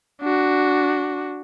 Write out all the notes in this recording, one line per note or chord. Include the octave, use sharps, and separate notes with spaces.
D4 F#4